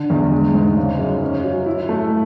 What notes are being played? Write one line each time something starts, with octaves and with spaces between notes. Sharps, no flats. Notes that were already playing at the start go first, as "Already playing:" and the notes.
Already playing: D3
E2
G#3
G#2
C#3
F#2
C#4
F#3
E4
A3